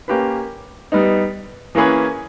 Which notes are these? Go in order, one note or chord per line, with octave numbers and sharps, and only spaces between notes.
A#3 C#4 G4 B4
G3 B3 D#4
E3 A#3 C#4 G#4 B4